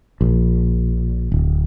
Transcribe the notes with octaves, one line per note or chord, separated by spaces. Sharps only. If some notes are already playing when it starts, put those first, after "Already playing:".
A#1
D1